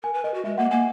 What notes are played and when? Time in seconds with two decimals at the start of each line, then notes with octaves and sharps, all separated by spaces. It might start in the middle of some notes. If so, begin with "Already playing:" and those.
0.03 A#4 G#5
0.14 B4
0.24 A#4 D#5
0.34 F#4
0.44 G#3 E5
0.58 A#3 F#5
0.71 A#3 G#5